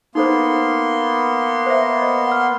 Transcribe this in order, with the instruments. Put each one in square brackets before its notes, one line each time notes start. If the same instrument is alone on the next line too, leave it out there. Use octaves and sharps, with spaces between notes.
[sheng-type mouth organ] A#3 B3 C6 [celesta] D#4 A4 C5
[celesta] C5 E5
D#5
F#5 F6